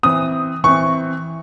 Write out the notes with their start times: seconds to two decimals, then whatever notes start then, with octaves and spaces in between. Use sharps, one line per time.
0.03 E3 C4 D#6
0.64 E3 C4 C#6